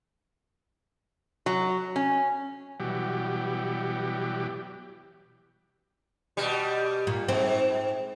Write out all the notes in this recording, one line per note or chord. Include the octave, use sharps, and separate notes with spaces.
F#3
C#4
B2 E3 F#3 G3 G4
B2 G3
A#2
G#2 C4